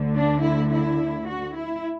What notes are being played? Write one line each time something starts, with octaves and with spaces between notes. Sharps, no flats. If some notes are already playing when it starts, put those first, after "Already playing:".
Already playing: D2 D3
D4
E4
E4
F#4
E4